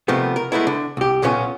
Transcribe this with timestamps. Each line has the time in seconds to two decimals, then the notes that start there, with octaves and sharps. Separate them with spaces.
0.08 C3 D#3 F3 A3 B3
0.36 A#4
0.52 G#3 A3 B3 E4
0.67 D3
0.97 C2 G4
1.22 B1 A#2 B3 C#4 F4